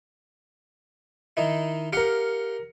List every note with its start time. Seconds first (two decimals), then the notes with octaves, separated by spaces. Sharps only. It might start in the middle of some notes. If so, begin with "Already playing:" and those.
1.37 D#3 D#4 E4
1.93 G4 A#4 F5 F#5 C#7